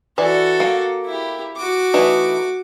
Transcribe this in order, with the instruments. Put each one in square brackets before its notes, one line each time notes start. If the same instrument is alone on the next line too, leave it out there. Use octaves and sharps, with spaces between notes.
[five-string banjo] E3 D5 [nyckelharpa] F#4 A4
[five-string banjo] A#3
[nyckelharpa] E4 G4
F#4 D6
[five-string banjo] E3 A3 D#4